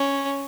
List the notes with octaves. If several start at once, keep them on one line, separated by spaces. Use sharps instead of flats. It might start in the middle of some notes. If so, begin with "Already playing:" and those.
Already playing: C#4